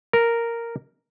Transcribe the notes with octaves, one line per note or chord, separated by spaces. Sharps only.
A#4